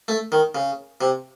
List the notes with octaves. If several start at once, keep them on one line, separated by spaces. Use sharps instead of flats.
A3
D#3
C#3
C3